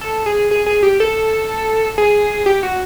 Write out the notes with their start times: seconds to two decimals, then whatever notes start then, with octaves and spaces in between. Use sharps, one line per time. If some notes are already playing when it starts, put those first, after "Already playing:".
0.01 A4
0.26 G#4
0.51 G#4
0.66 G#4
0.83 G4
1.00 A4
1.98 G#4
2.46 G4
2.63 F#4